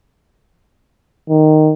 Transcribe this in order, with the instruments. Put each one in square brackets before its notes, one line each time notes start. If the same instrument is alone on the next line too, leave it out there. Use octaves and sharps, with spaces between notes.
[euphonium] D#3